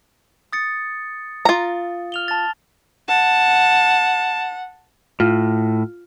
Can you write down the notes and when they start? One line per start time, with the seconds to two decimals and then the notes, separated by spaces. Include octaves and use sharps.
0.53 D#6 A6 C#7
1.45 F4 A#5
2.12 F6 F7 G7
2.28 A5 A6
3.08 F#5 A5
5.20 A2 F4